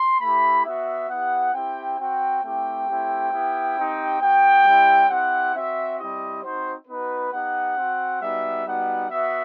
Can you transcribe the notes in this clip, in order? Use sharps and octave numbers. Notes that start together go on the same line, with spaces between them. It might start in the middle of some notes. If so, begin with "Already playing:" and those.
Already playing: C6
A3 E4 G4 B5
B3 F#4 E5
B3 E4 G4 F#5
C4 E4 G4 G5
C4 F#4 G5
A3 C4 E4 G4 G5
A3 C4 E4 G4
B3 E4 G4
C4 D#4 G4
B3 F#4 G5
G3 C4 E4 G4
C4 E4 G4 F#5
C4 F#4 E5
G3 C4 E4 G4 D#5
C4 D#4 F#4 C5
B3 D#4 F#4 B4
B3 D#4 G4 F#5
C4 F#4
G3 B3 D#4 F#4 E5
G3 B3 D#4 F#4 F#5
B3 F#4 E5